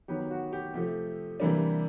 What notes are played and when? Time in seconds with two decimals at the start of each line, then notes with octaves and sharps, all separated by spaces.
0.08 D#3 F#3 B3 G4
0.31 F#4
0.53 G4
0.74 C3 F3 A3 G4
1.40 C3 E3 G3 A#3 D4